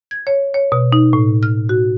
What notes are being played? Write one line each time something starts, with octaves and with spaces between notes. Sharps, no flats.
G#6
C#5
C#5
B2
D#4
A2
F6
F#4